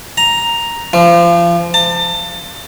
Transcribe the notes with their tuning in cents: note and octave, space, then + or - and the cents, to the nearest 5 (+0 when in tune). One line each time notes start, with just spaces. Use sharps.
A#5 +5
F3 -30
A5 +30